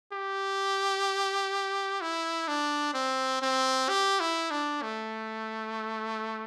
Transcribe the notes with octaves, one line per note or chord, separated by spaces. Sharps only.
G4
E4
D4
C4
C4
G4
E4
D4
A3